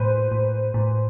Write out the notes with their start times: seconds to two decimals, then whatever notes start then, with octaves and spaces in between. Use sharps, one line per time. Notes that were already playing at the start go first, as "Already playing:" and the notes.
Already playing: A2 B4 C5
0.32 A2
0.74 A2